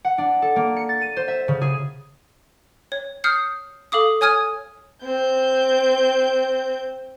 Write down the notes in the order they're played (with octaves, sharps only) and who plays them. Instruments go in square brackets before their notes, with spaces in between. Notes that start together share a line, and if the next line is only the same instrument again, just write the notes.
[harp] F#5
D4
A4
A#3
C#7
A6
D#7
C5
E5
C#3
G#4
[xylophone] C#5
D#6 F6 G6 C7 C#7
A4 F5 D6 D#6
C#5 G#5 D#6 F6 G#6 D#7
[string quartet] C4 G6